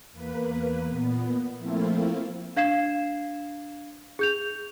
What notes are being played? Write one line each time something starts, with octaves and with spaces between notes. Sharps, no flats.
E2 A#3 B4
A#2 B3
F3 A3 A#3 C4 E4 F4
D4 F5 G#6 C7 E7
G#4 G6 F7